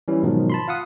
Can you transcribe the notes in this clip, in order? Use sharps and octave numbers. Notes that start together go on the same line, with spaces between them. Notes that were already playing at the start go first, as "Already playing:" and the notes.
E3 G3 C#4 E4
G#2 B2 D#3 F3 F#3
A5 B5 C6
F4 F5 F#5 D#6